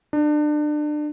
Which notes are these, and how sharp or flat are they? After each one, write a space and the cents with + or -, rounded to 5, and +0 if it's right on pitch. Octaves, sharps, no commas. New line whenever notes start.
D4 +30